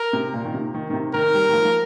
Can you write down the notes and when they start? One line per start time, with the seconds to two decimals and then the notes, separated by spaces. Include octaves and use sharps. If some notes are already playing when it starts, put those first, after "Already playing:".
Already playing: A#4
0.13 C3
0.34 A#2
0.45 D#3
0.54 C3
0.74 D#3
0.90 D#3
0.93 C3
1.14 D#3 A#4
1.34 G3
1.49 D#3
1.53 F3
1.65 F3